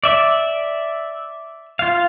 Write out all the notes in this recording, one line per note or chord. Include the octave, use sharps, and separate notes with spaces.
D5 E5
F4 F5